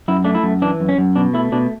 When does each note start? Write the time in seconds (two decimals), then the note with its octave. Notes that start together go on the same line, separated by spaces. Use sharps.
0.08 F#2 E4
0.24 A3 D4
0.35 E4
0.43 F#2
0.62 E3 D4
0.80 F#2
0.89 C#4
0.98 F#2
1.16 B2 D4
1.34 A3 E4
1.52 B2 D4